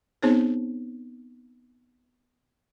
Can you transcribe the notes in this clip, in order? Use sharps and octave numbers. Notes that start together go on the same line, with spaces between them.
B3 C4 D#4 G#4 C5 C#5